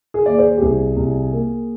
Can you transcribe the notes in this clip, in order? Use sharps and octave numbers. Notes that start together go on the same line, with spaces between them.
G#4
D#2 D5
G#4 C5
G4
C2 G#4
C2
A#3